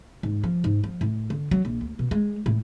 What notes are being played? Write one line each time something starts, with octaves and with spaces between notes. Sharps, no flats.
G#2
F3
G#2
F3
A2
D3
F#3
A#1
D2
B2
G#3
A2